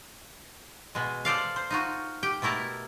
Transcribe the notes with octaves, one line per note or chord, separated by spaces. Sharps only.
B2 G#3
A4 C5 D5 F5
C5
D#4 F4 F#4
G4 G5
B2 A3 E4 A#4 A5